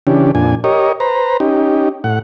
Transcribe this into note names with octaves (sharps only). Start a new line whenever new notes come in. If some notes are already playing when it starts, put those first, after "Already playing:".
C#3 E3 C#4 D4 G4
F2 A#2 D4 G#5
G4 A#4 C#5 D#5
B4 C5 A#5
C#4 D#4 G4
A2 F#5